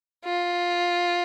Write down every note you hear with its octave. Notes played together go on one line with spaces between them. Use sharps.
F4